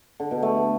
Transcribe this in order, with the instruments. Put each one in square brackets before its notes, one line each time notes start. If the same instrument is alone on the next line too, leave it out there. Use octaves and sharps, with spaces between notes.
[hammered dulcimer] D3
B2
A3